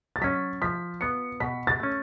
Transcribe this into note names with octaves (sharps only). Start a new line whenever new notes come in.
A6
F#3 C#4 B6
F3 B6
B3 F4 C#7
B2 B6
A6
A3 C#4